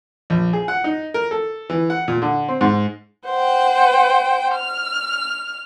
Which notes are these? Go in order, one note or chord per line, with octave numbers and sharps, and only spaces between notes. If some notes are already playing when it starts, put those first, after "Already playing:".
A#1
G#4
F#5
D#4
A#4
A4
E3
F#5
A#2
D3
C4
G#2
C5 F#5 G5
F6